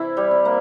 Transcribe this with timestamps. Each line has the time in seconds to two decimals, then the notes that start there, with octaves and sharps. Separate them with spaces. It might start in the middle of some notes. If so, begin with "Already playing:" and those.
Already playing: C3 E3 E4
0.17 G3 G4
0.31 C3
0.45 A#3